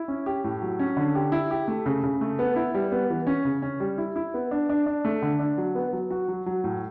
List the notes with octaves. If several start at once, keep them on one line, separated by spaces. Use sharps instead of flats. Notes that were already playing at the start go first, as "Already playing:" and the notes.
Already playing: E4
C#4
G4
A2
F#3
C#4
D3
G4
E4
G4
A3
C#3
C#3
A3
B3
E4
G3
B3
E3
C#4
C#3
C#4
G3
E4
E4
B3
D4
D4
D4
A3
D3
D4
F#3
B3
F#3
F#4
F#3
F#3
A2